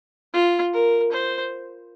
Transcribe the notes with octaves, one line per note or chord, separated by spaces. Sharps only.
F4
A#4
C5